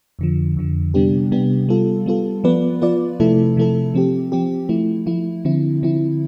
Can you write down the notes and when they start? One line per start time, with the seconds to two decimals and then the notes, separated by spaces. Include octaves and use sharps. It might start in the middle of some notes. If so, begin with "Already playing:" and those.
0.19 F2 D3 F3
0.57 F2 D3 F3
0.94 C3 G3 B3 D4 G4
1.32 C3 G3 B3 D4 G4
1.69 G3 B3 F4 A4
2.06 G3 B3 F4 A4
2.44 F3 B3 F4 B4 D5
2.81 F3 B3 F4 B4 D5
3.20 C3 F3 A3 E4 A4
3.57 C3 F3 A3 E4 A4
3.94 F3 C4 G4
4.32 F3 C4 G4
4.69 F3 A3 E4
5.06 F3 A3 E4
5.45 D3 F3 C4 E4
5.83 D3 F3 C4 E4